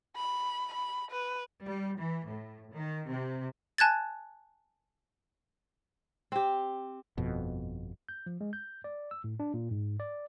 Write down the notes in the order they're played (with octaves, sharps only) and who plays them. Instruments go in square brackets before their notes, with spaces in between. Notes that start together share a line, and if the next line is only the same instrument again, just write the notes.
[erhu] B5
B5
B4
[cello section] G3
E3
A2
D#3
C3
[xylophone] G#5 A5 F#6 G#6 A6
[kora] C4 G4
[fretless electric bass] G1 F2 B2
[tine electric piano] G6
F3
G#3
G6
D5
E6
A2
D4
A#2
G#2
D5